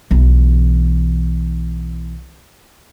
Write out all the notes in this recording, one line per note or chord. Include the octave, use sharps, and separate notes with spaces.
B1 E3